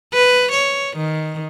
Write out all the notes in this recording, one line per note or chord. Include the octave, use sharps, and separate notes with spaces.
B4
C#5
D#3